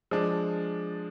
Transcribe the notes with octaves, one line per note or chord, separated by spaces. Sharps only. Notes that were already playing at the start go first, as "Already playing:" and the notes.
F3 G#3 D4